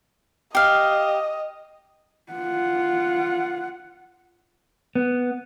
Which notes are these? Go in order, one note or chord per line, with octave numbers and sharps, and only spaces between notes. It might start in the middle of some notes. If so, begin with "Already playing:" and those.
G4 D#5 F5
F4 F#5
B3